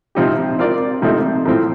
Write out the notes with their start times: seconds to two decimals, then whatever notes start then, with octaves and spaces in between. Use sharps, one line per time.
0.15 C3 F3 C4 D#4 G4
0.59 C4 F4 A#4 D5
1.02 C3 F3 A3 C4 D#4
1.45 A2 F3 C4